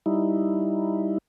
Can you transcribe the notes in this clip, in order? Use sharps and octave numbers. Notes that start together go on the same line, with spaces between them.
G3 D#4 E4